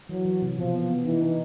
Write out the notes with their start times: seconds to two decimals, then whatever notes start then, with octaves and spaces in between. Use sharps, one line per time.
0.09 E3 F#3
0.25 E3
0.42 C3
0.58 B2 F3
0.74 B3
0.90 B3
1.05 E3 D#4
1.22 D#4